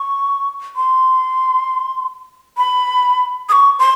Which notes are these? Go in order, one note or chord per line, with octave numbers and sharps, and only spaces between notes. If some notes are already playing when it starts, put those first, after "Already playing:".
Already playing: C#6
C6
B5
D#6
C#6
C6